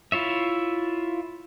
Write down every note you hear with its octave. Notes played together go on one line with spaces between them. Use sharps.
E4 F4 C#5 E5